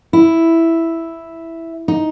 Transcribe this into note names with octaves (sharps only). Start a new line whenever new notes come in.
E4
D#4